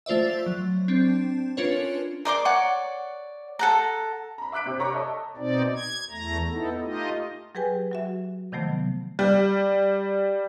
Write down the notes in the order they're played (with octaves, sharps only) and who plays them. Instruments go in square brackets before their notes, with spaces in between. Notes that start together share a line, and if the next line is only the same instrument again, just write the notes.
[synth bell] A3 F4 C5 D5 E5
F#3
C4 D4
C#4 D4 F4 A#4 B4 C#5
[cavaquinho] A#4 D5 C6 D6
C#5 D5 F#5
A4 F#5 A#5
[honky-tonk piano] A#5 B5
E5 D6 F#6 B6 D7
C3 G4
C#5 A#5 C#6 D6
A4 D#5 E5
[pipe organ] B2 C4 D#4 D5
G#6
E2 A3 A#5
B3 D#4 E4 A4
A3 D#4 F4 G4 D#5
[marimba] F#3 G4 G#4 B4 G5 G#5
F#3 F#4 E5
C3 D#3 F3 F#3 A3 B3
[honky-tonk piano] G3